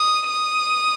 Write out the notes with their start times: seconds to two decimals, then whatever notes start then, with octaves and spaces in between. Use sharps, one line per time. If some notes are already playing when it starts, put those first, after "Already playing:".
Already playing: D#6
0.30 D#6